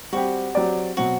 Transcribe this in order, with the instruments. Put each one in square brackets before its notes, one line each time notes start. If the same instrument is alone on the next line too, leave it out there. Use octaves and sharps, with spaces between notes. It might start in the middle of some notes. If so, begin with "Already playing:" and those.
[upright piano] G3 C4 G4 [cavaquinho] F#4
[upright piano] F#3 C4 G4 D5
[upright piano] B2 F#3 C4 [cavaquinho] F#4